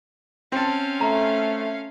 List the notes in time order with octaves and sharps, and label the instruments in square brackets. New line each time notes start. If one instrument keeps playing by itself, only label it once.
[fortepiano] C4 A5 [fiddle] C#4 F5
[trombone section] A3 [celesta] A#5